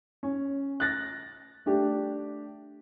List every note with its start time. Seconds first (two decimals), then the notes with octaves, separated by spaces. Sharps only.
0.23 C#4
0.80 F#6 A6 A#6
1.66 A3 D4 G4